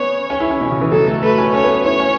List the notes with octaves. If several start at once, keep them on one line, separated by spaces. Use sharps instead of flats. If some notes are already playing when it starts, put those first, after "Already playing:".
Already playing: B3 C#4 C#5
C#4
E4
C#4
B2
C#3
E3
F#3 A4
A3
A3 B4
C#4
C#4 C#5
B3
E4 C#5
C#4